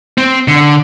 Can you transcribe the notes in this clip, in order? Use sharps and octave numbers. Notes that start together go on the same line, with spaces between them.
C4
D3